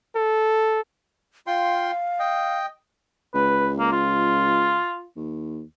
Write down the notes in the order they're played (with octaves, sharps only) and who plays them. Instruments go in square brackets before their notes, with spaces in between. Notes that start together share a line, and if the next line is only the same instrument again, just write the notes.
[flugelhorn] A4
[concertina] F4 G5 C6 [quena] F5
[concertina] D#5 G5
[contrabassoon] C#2 [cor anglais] B4
[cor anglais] A#3
F4
[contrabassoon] D#2